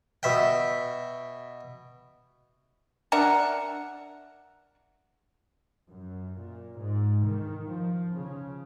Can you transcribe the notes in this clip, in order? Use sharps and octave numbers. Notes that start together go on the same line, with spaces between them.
B2 E5 G5
D4 A#4 E5 F#5
F#2
A#2
G#2
D#3
F3
C#3